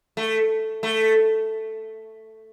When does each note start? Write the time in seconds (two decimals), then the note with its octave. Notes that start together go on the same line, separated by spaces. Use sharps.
0.17 A3
0.83 A3